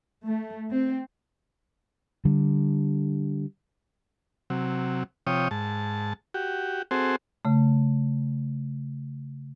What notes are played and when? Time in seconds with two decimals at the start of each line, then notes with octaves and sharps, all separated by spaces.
0.25 A3
0.71 C4
2.25 D3 G3
4.50 C3 F#3
5.27 C3 F3 C#5 G5 D#6
5.51 G#2 A5
6.34 F#4 G4
6.91 C4 F#4 G#4 A4 C5
7.45 C#3 A3